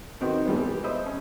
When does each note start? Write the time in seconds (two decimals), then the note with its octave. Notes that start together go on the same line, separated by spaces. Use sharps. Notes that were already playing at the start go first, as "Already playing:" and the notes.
0.21 D#3 C4 F#4 B4
0.46 B2 E3 G3 G#3 B3
0.84 C5 D#5 E5 B5 D#6
1.06 C#4